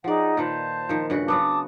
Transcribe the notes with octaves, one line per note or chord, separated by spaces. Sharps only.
F3 D#4 G#4 D5 F#5
A#2 D#3 B4 C5 A5
D#3 F3
G2 C#3 F#4
C#3 F#3 B3 A5 D6 D#6